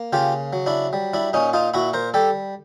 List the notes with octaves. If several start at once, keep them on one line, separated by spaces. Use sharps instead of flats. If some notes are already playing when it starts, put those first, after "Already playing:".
Already playing: A#3
C#3 F4 G4
F#3
D4 E4
G3
D4 E4
A#2 C#4 D#4
D#4 F4
A#2 E4 F#4
A#4 C5
G3 G4 A4